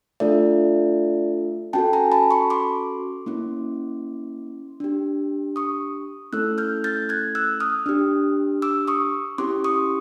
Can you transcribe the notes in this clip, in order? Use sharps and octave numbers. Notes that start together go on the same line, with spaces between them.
A3 D4 F4 A4 D5 E5
C#4 F#4 A4 G5 A5
G#5 A#5
A5 B5
B5 C#6
C6 D6
A#3 C#4 E4
D4 G4
C#6 D#6
A3 C#4 E4 A4 E6 F#6
F6 G6
G6 A6
F#6 G#6
E6 F#6
D#6 F6
D4 G4
D6 E6
C#6 D#6
C#4 E4 G4 C6 D6
C#6 D#6